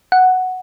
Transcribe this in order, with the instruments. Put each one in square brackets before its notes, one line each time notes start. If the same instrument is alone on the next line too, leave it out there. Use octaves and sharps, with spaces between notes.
[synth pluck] F#5